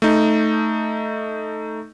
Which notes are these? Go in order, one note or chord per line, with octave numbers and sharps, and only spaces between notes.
A3 D#4